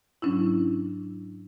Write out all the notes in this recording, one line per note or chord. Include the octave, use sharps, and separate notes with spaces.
G#2 F#3 C#4 D4 E4